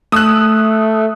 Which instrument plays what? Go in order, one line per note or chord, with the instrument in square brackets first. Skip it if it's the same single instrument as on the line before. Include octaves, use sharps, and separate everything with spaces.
[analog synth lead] A3 [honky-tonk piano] D#6 E6 F#6